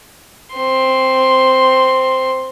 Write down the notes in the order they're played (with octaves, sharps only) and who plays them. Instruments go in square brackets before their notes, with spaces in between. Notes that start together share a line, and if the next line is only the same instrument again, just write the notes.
[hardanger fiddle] C4 C6